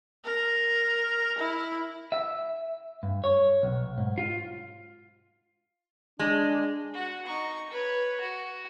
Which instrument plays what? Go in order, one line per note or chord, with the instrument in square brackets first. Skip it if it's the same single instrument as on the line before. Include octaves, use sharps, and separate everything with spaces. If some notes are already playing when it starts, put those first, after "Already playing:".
[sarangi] A#4
E4
[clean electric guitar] E5
G2
C#5
B1
G#2
F4
[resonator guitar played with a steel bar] G#3 [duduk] D4
[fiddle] F#4 F#5
D#4 C#6
B4 C#5
F#4